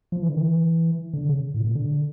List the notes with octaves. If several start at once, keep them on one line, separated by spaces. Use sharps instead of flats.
F3
E3
D3
E3
D3
C#3
A2
A#2
D3